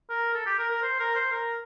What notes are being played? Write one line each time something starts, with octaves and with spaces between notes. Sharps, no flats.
A#4
A4
G4
A#4
A#4
C5
A#4
C5
A#4